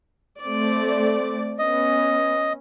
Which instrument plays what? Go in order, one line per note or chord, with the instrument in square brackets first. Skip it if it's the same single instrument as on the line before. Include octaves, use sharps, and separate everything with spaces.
[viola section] A3 C4 D5
[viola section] B3 C#4 [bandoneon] D#5